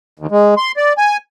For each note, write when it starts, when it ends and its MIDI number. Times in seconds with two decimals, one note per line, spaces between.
0.19 0.27 39
0.31 0.54 56
0.57 0.72 84
0.77 0.93 74
0.98 1.17 80